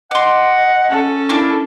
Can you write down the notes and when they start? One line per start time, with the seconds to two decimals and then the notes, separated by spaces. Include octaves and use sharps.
0.11 D#5 F#5 C6 D6
0.89 C#4 A4
1.29 A#3 D4 E4 D6